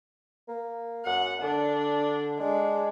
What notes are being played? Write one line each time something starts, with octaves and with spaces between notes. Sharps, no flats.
A#3
F#2 F#5
D3 D4
G#3 D4